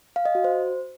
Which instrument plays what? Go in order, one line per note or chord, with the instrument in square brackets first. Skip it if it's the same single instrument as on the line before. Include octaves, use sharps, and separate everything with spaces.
[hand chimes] F5
D#5
F#4
C5